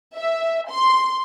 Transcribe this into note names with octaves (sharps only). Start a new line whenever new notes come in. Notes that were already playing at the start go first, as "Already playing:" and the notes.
E5
C6